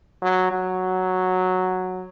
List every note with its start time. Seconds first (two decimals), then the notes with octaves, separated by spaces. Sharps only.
0.22 F#3
0.51 F#3